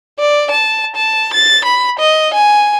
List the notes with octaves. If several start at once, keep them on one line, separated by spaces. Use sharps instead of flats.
D5
A5
A5
A6
B5
D#5
G#5